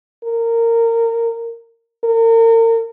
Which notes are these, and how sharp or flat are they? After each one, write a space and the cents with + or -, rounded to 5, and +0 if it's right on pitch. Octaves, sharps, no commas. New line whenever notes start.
A#4 -20
A#4 -35